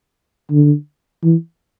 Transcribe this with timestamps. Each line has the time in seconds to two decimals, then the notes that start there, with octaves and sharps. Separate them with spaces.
0.51 D3
1.23 E3